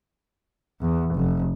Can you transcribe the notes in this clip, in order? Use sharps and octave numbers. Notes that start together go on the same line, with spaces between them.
E2
F1